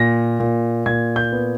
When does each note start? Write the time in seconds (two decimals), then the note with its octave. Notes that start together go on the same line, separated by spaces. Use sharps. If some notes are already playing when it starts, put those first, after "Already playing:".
Already playing: A#2 A#6
0.40 A#2
0.86 A#2 G#6
1.16 G6
1.32 B3